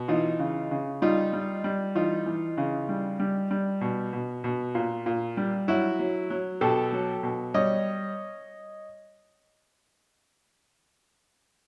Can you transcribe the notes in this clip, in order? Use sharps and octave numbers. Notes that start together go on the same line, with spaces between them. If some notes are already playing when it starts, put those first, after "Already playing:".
Already playing: B2
E3 D#4 F4
C#3
C#3
G3 D#4 F4
G3
G3
E3 D#4 F4
E3
C#3
G3
G3
G3
B2
B2
B2
A#2
A#2
G3
F#3 E4 F#4
F#3
F#3
B2 G4 A4
F#3
B2
G3 C#5 D#5